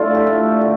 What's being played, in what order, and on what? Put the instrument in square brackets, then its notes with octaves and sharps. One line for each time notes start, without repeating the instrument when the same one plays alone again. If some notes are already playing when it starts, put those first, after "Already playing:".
Already playing: [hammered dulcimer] A3 D4 F4 A4
G4
A3
D3